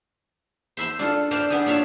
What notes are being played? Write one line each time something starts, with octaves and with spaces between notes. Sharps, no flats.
C5 E5 B5 C6
D4 F4 A4
B4 C5 D5 E5 F5 G5
B3 D4 G4 G#4
D4 F4 C#5 E5 F5